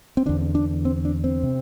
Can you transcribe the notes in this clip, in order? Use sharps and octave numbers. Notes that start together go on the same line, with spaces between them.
C4
E2 D3 D4
D4
C4
D4
C4
C3